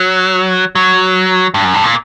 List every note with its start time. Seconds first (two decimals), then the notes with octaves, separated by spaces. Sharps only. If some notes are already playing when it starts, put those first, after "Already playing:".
Already playing: F#3
0.75 F#3
1.54 G2
1.64 F#2
1.74 G2
1.84 A#2